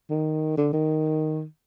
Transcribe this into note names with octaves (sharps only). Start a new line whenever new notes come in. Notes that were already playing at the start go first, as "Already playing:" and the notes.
D#3
D3
D#3